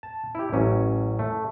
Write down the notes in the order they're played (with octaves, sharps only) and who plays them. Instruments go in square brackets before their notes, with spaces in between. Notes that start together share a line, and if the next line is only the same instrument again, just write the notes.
[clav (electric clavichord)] A5
E4 G4
A1 F#3 C#4
A3